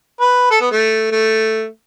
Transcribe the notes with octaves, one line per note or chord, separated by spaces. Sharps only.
B4
A4
B3
A3
A3